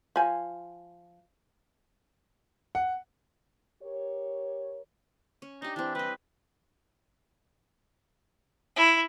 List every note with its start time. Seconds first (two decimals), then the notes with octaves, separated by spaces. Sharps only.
0.16 F3 G#5
2.75 F#5
3.82 G4 A#4 C#5
5.42 C#4
5.62 D4 D#4 G4
5.76 E3 C4 D4
5.95 G3 B4 D#5
8.76 E4